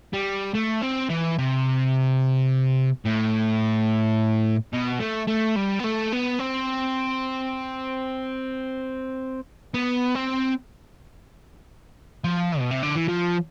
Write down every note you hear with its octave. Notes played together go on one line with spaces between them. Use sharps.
G3
A3
C4
E3
C3
A2
B2
A3
A3
G3
B3
A3
B3
C4
B3
C4
F3
B2
C3
D3
E3
F3